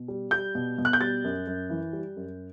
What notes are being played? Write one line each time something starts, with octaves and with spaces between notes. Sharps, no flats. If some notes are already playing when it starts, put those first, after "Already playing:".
Already playing: B2
G3
G3 G6
B2
B2
F#6
G6
G3 A6
F#2
F#2
E3
G3
F#2